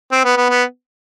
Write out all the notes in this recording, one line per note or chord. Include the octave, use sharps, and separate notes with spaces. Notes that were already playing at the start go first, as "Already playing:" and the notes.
C4
B3
B3
B3